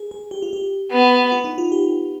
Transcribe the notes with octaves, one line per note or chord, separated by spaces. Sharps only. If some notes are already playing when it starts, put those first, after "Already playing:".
Already playing: G#4
G#4
G4
F4
G4
B3
F4
D#4
F4
G4